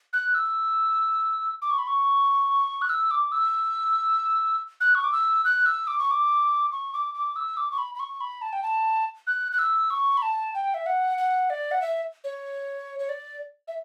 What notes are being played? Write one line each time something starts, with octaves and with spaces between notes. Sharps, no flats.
F#6
E6
D6
C#6
B5
C#6
F#6
E6
D6
E6
F#6
C#6
D6
E6
F#6
E6
D6
C#6
D6
C#6
D6
D6
E6
D6
C#6
B5
B5
C#6
B5
A5
G5
A5
F#6
F#6
E6
C#6
B5
A5
G5
E5
F#5
F#5
D5
F#5
E5
C#5
C#5
D5
E5